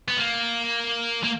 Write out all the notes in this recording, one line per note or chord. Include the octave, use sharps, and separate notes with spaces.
B3
A#3
A#3